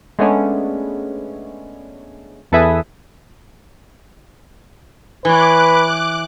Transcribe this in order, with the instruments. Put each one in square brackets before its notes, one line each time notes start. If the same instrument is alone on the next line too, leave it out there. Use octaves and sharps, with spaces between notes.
[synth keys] G#3 A3 B3 C#4 D4
E2 A4 B4 E5 G#5 D#6
[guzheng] E3 C#5 [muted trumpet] B4 [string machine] D6 F#6